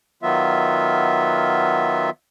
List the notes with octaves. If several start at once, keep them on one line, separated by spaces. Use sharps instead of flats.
D#3 F#3 B3 F4 E5